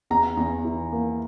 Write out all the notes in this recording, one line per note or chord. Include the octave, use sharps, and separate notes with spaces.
E2 A#5
E2
E3
A#3